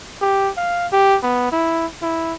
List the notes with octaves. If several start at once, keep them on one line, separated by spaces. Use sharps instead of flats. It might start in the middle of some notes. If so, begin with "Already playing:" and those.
G4
F5
G4
B3
E4
E4